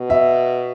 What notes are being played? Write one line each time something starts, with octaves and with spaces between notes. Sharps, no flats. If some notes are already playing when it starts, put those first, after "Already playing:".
Already playing: B2
E5